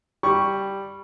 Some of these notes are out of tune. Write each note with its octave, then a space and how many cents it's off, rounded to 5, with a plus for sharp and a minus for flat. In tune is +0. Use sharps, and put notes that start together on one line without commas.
G3 +0 C#6 +0